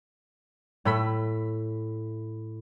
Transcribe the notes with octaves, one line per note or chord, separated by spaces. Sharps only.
A2 A3 B5 B6